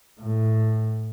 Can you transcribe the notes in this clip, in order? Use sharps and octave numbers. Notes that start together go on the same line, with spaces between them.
A2